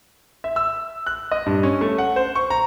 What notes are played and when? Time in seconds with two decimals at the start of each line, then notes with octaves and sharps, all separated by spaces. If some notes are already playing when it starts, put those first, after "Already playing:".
0.44 E5
0.56 E6
1.07 F#6
1.31 D#5
1.46 G2
1.63 C#4
1.81 A3
1.98 F#5
2.16 C5
2.35 C#6
2.50 A#5